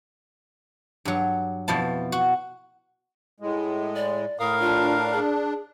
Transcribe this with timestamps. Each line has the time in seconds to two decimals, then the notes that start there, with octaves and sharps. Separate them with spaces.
1.05 G2 F#3
1.68 F2 B2 F3 E4 A5
2.12 F#4
3.40 A2 G#3
3.96 D5
4.40 A2 A#4 F5 D#6
4.61 D4 F4
5.13 G#4